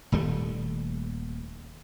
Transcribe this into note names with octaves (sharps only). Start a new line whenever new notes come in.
D#1 D#2 G3 A3